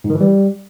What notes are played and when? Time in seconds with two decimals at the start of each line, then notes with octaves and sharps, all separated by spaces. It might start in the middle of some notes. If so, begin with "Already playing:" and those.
0.04 G#2
0.10 D#3
0.15 E3
0.21 G3